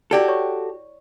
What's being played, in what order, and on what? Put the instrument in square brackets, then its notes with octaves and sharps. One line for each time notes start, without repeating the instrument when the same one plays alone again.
[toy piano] E4 D5 [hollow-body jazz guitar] F#4 G4 A4
[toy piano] C#5 C#6